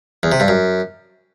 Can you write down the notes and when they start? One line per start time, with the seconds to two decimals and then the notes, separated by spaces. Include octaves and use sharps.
0.23 E2
0.32 C3
0.40 G2
0.48 F#2